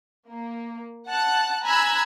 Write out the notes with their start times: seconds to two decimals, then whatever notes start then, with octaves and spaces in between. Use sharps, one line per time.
0.30 A#3
1.08 F#5 A5 F#6
1.64 G#5 A#5 B5 E6 F#6 G#6